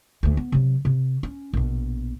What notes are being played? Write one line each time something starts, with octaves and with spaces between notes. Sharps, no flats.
D2 A3
B3
C3 F#3
C3
C#4
A#1 B2